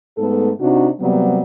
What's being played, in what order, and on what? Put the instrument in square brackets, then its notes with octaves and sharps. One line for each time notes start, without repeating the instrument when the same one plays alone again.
[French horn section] G#2 A3 B3 A4
C3 D4 D#4 F#4
C3 F#3 G3 A#3 B3